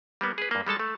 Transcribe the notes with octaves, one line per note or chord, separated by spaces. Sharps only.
G3 A#3 B3
G#4 B4
G2 A#3
G3 G#3 A4 A5
A3